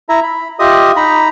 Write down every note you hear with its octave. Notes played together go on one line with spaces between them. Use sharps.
E4 E5 A#5
B5
F4 G4 D#5 E5 D#6
D#4 A#5 B5